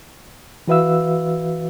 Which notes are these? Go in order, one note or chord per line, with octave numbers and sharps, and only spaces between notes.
E3 F#4 B4 E5 F5 E6